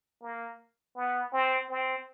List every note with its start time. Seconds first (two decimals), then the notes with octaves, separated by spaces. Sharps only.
0.22 A#3
0.96 B3
1.33 C4
1.70 C4